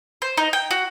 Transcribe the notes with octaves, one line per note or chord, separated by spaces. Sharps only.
C5
D#4
G5
F#4